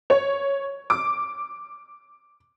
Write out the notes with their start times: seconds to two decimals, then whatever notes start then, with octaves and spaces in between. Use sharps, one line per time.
0.10 C#5
0.90 D6